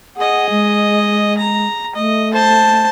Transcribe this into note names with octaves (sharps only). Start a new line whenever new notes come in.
G#4 D#5 F#5
G#3
A#5
A3 D#5
C5 A5